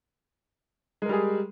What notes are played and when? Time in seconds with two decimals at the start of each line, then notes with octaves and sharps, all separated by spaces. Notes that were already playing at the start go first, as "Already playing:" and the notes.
1.02 G#3
1.05 A#4
1.09 G3
1.13 G#4